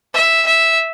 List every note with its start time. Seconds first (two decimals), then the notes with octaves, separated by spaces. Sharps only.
0.14 E5
0.46 E5